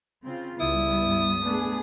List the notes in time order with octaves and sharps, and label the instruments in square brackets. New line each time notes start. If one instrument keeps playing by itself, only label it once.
[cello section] C#3 C4 F4
[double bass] C#2 [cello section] G3 B3 [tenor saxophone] E4 [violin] D#6
[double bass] G2
[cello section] A3 G#4 [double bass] B3 D4